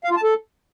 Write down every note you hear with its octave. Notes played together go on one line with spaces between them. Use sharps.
F5
F4
A5
A4